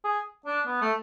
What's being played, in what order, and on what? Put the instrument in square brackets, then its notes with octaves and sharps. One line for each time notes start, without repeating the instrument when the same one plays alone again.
[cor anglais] G#4
D4
B3
A3